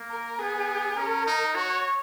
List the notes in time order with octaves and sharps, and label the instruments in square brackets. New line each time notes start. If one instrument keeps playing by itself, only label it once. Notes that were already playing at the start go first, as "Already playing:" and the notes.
Already playing: [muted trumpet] A#3
[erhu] A#4
[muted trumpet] B3 [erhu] G#4
[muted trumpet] C#4 [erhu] A#4
[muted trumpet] D#4
[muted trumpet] F#4 [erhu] C#5